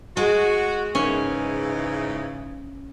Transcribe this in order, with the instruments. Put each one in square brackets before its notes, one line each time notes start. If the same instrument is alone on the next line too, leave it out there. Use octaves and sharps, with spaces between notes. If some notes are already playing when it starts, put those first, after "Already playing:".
[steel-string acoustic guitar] G#3 [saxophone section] F#4
[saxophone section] G#2 C#3 E3 [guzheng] C#4